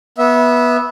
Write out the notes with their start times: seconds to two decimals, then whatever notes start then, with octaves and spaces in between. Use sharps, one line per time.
0.18 B3 E5